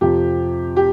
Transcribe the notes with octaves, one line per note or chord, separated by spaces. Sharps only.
F2 C3 F3 G4
G4